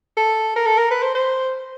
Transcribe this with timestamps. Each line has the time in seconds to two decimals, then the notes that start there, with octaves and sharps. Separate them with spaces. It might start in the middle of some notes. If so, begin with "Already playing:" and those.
0.17 A4
0.56 A#4
0.66 A4
0.78 A#4
0.91 B4
1.03 C5
1.15 C5